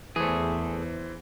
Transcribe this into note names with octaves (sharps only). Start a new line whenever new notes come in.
E2 E3 A3 G#4 C5